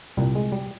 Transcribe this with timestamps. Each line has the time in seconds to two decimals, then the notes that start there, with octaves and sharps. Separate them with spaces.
0.17 C2 A#2 G3
0.35 G#3
0.52 G3